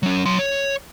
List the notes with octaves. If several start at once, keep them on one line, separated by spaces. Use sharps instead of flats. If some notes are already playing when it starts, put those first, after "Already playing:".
F#3 C#4
F#3 C6
C#5